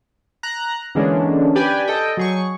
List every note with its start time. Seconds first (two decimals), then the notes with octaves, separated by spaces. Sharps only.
0.43 A#5 F#6
0.95 D3 E3 G#3 A#3 C#4 D4
1.55 G4 B4 D5 G5 G#5
1.88 A4 D#5 G5
2.17 F#3 G#4 C#6